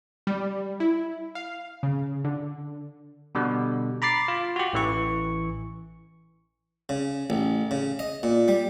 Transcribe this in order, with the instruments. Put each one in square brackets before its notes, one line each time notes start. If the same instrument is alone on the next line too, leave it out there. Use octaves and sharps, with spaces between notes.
[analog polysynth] G3
E4
F5
C#3
D3
[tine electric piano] B2 D3 G3
A#5 B5 D6 A6 C7
F4
F#4 G4
A1 E3 C#6
[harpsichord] C#3
A1
C#3
D#5
A#2
G3